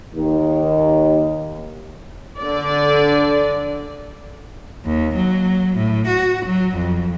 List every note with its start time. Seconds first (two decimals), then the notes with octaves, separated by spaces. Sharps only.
0.15 D#2 D#3
2.39 D3 D5
4.85 D#2
5.15 F#3
5.76 A2
6.07 F#4
6.46 F#3
6.76 F2